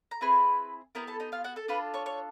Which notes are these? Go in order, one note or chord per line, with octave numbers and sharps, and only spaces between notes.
A#5
C4 E4 G#4 B4 B5
B3 E4 G4 A#4 A#5
A4 A5
D#4 D#5
F4 F5
F#4 F#5
A4 A5
D4 F4 A4 B4 B5
C#5 C#6
C#5 C#6